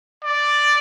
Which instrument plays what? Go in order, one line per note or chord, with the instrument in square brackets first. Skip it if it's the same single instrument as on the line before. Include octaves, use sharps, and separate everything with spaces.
[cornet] D5